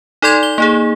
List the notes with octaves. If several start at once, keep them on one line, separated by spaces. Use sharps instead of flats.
D#4 A4 D5 C6 G#6
G7
A#3 D#4 G#4